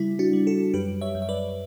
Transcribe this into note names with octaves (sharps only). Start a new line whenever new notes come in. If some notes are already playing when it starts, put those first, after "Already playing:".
Already playing: C#3 G3 E4
D4 F#4
G3
F#4 A4
F#2 G4 B4
C#5 E5
F#2
E5
B4 D5